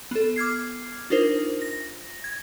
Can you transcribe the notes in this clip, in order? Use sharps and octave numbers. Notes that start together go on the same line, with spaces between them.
B3 A4
D6 F6 G#6 C7
D4 D#4 F4 A#4 C5
A#6
G#6